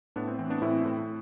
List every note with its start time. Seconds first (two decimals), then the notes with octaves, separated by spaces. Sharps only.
0.16 A2 B3 D4
0.28 C4
0.39 E3 C4
0.50 B3 D4
0.62 A2 C4 E4
0.85 A2